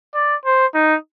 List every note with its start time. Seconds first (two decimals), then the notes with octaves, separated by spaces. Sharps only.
0.14 D5
0.45 C5
0.75 D#4